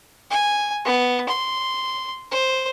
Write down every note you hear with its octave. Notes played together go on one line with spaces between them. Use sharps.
G#5
B3
C6
C5